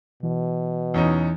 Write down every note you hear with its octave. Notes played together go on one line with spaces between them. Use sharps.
B2 E3
E2 C#4 D#4